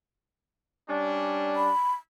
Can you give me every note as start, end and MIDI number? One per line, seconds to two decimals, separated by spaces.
0.88 1.69 55
0.88 1.69 61
0.88 1.69 62
1.55 1.92 83